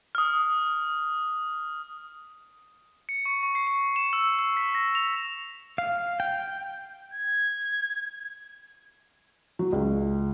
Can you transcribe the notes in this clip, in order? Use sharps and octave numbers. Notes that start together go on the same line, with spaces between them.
D#6 F6
C#7
C#6
C#6
C7
C#6
E7
E6
E6
B6
A#6
F7
F5
G5
G#6
F#3
C#2